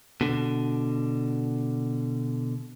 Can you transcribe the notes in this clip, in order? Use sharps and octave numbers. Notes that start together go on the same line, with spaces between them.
B2 D3